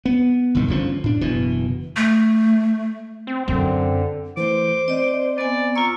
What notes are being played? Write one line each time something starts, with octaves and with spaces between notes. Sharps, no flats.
B3
F#1 C2 A2 D#3
G1 D3 F3 C#4
A2 D4
F#1 B2 E3
A3
C4
F#2 D3 C4
E3 A3 C5 D6
C4 D5 D#5
B3 D5 G#5
F4 A#5 C#6 E6